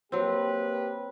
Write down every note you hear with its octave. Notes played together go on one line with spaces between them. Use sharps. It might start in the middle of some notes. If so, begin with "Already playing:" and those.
F#3 A#3 C4 G4 B4